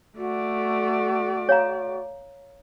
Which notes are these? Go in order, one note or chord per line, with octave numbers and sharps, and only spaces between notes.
A3 F#4 D5
C#5 F5 A#5